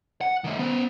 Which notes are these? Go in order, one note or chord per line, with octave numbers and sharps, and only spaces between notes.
F#5
D#3 A3
B3 C5